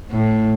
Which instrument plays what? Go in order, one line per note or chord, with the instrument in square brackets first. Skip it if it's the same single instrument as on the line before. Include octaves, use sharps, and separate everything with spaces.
[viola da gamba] A2